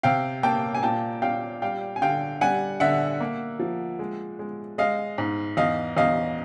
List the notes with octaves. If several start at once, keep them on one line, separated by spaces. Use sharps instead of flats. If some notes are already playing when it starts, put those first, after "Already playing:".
C3 F5 G5
A#3 G5 A5
G#5
A#2 G5 A5
A#2 F5 G5
G3 F5 G5
G#5
D3 F5 G5
G3 F#5 G#5
D3 E5 F#5
A#3
F3
G#3
G#3
G#3 D#5 F5
G#2
E2 D#5 F5
E2 D#5 F5